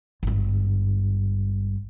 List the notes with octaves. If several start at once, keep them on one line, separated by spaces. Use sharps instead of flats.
G#1 G2